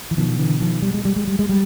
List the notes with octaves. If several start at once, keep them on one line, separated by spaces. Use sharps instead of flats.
E3
B2 D#3 F3
D3 E3
D#3 F3
G3
G#3
G3
G#3
G3
G#3
G3